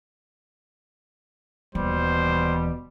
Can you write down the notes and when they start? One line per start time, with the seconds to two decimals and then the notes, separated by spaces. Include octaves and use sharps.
1.75 D#1 B2 E3 G3 C5